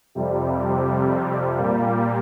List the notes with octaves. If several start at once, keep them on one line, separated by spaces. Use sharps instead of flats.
F2 C3 G3
A#2 G3 A#3